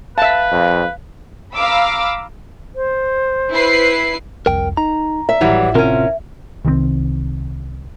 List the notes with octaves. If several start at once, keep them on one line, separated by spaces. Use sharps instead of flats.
B4 E5 F5 A5
F2
F5 A#5 B5 D6 E6
C5
E4 B4 C7
G1 C2 F2 A#4 G5
D#4 A#5
E5
G#1 A2 E3 F#3 G3
C3 C4 C#4 F4 A#4
C2 D#3 G#3 C4